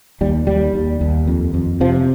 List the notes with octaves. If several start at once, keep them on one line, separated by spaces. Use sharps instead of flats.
D#2 G3
D#2 G3
D#2
D#2
F2
F2
C3 F3